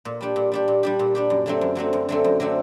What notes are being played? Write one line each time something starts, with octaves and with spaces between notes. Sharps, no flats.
A#2
G3 D4 G4
A#2
G3 D4 G4
A#2
G3 D4 G4
A#2
G3 D4 G4
F#2
D3 F#3 A3 C4
F#2
D3 F#3 A3 C4
F#2
D3 F#3 A3 C4
F#2
D3 F#3 A3 C4